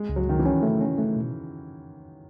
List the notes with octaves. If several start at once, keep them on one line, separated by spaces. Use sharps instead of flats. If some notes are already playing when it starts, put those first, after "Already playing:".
Already playing: G#3
C#2
F#3
C#2 D#3
E3
C#4
C#3 A3
C#4
A3
B2